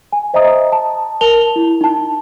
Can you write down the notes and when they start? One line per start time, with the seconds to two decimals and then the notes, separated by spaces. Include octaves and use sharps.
0.12 G#5
0.34 C5 D#5 E5 A#5 D#6
0.72 A5
1.21 A#4 A5 F7 G7
1.56 E4
1.81 D#4 A5